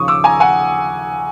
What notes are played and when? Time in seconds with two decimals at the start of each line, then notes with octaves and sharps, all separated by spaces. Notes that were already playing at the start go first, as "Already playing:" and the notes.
Already playing: D#2 C#3 F3 C#6 D#6
0.08 D6 E6
0.24 G#5 A#5
0.40 F#5 G#5